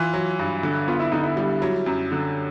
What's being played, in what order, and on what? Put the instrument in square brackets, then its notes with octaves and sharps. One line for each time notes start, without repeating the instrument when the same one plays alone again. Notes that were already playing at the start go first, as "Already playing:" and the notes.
Already playing: [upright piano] E3 [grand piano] F4
[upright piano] F#3
G2
D3
[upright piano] B3 [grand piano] F4
[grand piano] E4
[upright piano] D3 [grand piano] D#4
[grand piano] E4
[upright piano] G3
F#3
F#2
D3